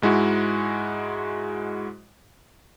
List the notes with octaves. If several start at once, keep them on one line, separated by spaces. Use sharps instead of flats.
G#2 G#3 E4 F#4